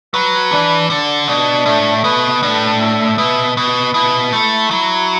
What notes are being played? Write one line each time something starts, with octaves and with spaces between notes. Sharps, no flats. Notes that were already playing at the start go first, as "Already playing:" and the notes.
F#3 B4
E3 D4
D3 D4
B2 D4
A2 A3
B2 B4
A2 D4
E5
B2 B4
B2 B4
B2 E4
A3 E4
F#3 E4